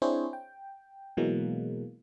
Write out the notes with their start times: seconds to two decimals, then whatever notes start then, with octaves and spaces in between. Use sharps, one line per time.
0.02 C4 D4 E4 G#4 C5 C#5
0.33 G5
1.17 B2 E3 F#3 G#3 A#3